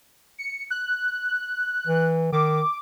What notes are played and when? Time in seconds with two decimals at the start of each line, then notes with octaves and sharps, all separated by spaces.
0.38 C#7
0.71 F#6
1.87 E3
2.32 D#3 D6